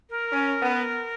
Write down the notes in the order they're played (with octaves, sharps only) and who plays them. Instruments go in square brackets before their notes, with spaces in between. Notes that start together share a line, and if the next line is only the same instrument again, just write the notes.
[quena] A#4
[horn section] C#4
B3